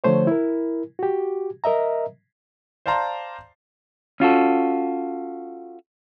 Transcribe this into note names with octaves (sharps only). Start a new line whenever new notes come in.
D3 F3 A3 C5 C#5
E4 A#4
F#4 G4
A#4 D#5 E5 A#5
C5 D5 F5 A5 A#5 C6
C#4 F4 F#4 A4